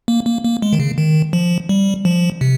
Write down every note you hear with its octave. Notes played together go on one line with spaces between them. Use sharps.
A#3
A#3
A#3
G#3
D#3
C#3
D#3
F3
G3
F3
C3